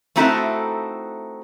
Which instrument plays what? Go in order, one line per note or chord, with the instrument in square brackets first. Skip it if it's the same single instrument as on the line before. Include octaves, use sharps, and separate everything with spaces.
[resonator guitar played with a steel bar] A3 C4 D#4 E4 F#4 A4